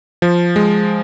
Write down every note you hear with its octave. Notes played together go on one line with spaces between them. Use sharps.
F3
G#3